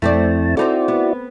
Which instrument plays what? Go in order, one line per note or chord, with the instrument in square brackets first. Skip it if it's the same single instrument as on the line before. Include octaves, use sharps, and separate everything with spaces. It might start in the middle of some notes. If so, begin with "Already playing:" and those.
[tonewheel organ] F2 E4 A5 [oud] A3 C4 D5
[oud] C4 D#4 A4 [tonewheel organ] E4 F#4 D5
[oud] B3